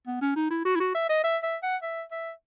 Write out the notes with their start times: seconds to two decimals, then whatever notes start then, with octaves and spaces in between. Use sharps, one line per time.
0.07 B3
0.21 C#4
0.36 D#4
0.50 E4
0.65 F#4
0.76 E4
0.80 F#4
0.95 E5
1.09 D#5
1.24 E5
1.43 E5
1.63 F#5
1.82 E5
2.11 E5